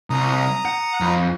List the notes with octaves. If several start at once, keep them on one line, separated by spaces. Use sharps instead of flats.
C2 A#5 D#6
F#5
F2